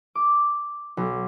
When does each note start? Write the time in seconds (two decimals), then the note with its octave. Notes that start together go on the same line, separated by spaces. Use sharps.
0.15 D6
0.97 B1